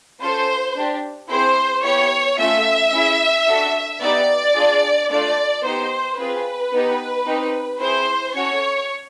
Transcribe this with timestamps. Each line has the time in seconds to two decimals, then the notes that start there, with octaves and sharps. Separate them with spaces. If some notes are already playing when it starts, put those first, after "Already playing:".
0.20 C#4 F4 A4 C5
0.76 D4 G4
1.29 C4 E4 G#4 C5
1.83 B3 E4 G4 C#5
2.38 A3 C#4 F4 A4 E5
2.92 C#4 E4 G#4
3.47 D4 F#4 A4
4.00 B3 D#4 G4 D5
4.55 D4 F4 G#4
5.09 A3 D4 F4 D5
5.63 B3 D#4 G4 C5
6.18 C4 F4 G#4 B4
6.72 B3 D#4 G4
7.26 C4 D#4 G4
7.80 C4 E4 G#4 C5
8.34 C#4 F#4 A4 C#5